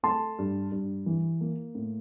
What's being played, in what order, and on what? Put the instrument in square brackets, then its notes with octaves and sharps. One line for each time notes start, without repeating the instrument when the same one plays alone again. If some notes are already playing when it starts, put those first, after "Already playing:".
[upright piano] A3 A5 C6
G2
G2
E3
A#3
A2